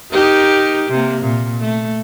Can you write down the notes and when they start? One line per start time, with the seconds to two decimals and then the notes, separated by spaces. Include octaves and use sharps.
0.12 D#4 G4 A#4
0.91 C3 A#3
1.21 A#2
1.61 A3